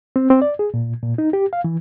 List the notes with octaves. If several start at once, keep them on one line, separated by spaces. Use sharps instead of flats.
C4
C4
D5
G#4
A#2
A#2
D#4
G4
F5
E3